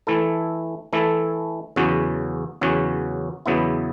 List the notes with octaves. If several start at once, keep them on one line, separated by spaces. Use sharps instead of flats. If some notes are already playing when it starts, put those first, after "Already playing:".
E3 A3 E4 A4
E3 A3 E4 A4
E2 C#3 F#3 C#4 F#4
E2 C#3 F#3 C#4 F#4
E2 C#3 F#3 B3 E4